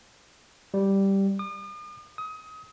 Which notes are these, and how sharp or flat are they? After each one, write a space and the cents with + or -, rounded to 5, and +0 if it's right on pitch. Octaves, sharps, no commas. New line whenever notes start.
G3 -5
D#6 -45
D#6 +25